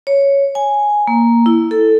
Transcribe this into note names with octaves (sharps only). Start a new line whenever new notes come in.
C#5
G#5
A#3
E4
A4